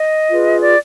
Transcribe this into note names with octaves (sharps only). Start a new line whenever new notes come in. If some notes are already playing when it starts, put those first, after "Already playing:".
Already playing: D#5
F4 G#4 B4
D5